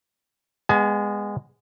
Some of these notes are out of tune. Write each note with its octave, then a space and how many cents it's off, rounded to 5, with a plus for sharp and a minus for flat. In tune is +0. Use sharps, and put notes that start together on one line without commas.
G#3 -20 B3 +0 G#5 +40